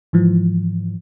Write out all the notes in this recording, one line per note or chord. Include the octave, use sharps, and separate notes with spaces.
G#2 E3 F3